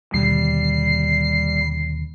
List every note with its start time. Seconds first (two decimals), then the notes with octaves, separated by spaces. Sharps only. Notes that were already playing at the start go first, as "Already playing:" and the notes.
0.14 D#2 B2 D3 G3 C7